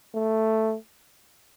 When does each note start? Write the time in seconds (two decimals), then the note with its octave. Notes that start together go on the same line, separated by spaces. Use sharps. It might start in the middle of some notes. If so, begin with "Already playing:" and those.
0.15 A3